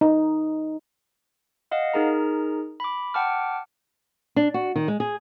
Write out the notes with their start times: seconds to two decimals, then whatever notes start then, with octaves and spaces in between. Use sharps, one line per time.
0.01 D#4
1.71 D#5 F5 F#5
1.94 D#4 G#4 A#4 A#5
2.80 B5 D6
3.14 F#5 G5 A5 D6 F6
4.36 D4
4.54 F#4
4.76 D#3
4.88 G#3
5.00 G#4